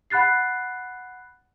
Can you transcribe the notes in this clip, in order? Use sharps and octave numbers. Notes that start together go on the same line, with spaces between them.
F#5 B5 F#6 A6 C7